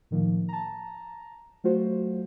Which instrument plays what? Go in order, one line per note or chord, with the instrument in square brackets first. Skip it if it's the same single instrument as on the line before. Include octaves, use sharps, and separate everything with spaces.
[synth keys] A2 D#3 F3 A#3
A5 A#5
F#3 A3 F4 F#4 C5